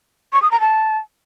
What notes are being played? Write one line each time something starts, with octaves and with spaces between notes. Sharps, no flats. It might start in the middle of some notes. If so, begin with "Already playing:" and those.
C#6
D#6
A#5
A5